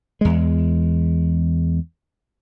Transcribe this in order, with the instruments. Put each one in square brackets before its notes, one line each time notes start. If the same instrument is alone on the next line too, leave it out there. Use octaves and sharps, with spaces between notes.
[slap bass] E2 G#3